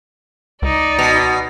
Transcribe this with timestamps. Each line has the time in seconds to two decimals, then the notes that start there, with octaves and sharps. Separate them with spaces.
0.62 C#2 D#4 D5
0.99 B2